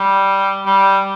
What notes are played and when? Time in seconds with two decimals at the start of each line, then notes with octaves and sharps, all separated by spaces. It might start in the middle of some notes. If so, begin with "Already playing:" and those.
Already playing: G3
0.66 G3